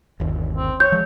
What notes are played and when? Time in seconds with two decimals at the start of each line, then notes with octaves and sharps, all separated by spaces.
0.20 G1 D#2
0.56 C4
0.80 C#5 G6
0.92 F3 G#3